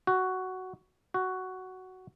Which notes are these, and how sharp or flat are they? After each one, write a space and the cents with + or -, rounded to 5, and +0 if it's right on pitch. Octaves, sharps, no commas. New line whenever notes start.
F#4 +5
F#4 +5